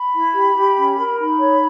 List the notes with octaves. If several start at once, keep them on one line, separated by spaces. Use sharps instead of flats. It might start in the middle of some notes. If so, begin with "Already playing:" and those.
Already playing: B5
E4
G4
G4
C#4
A#4
D#4 B5
C#5